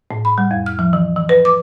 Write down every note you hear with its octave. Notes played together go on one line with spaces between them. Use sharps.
A2
B5
G3
F2
F6
F3
E3
E3
B4
D6